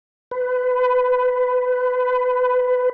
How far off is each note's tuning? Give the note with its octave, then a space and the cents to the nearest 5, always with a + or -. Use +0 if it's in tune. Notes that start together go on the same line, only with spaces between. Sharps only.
B4 +25